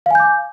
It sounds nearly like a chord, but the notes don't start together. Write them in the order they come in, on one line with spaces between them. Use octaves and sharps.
F5 G#5 G6 D6